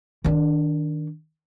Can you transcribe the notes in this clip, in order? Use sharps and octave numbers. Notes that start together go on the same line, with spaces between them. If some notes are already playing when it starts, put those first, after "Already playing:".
D#3 D4